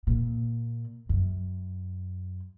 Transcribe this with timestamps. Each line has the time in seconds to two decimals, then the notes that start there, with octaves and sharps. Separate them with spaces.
0.07 A#2
1.09 F#2